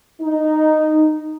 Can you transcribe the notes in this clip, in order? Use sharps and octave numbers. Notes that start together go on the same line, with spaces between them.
D#4